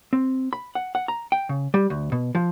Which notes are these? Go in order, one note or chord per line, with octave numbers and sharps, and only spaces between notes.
C4
B5
F#5
F#5
A#5
G5
C#3
G3
D2
B2
F3